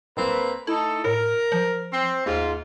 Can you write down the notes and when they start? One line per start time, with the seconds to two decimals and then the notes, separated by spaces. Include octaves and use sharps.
0.17 D1 A#3 C4 B4
0.67 A3 D#4 E4 A4
1.04 A2 A#4
1.52 F3
1.93 C4
2.26 D#2 G#2 F4